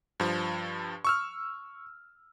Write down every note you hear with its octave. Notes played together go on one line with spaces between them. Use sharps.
G2 F3
C#6 E6 F6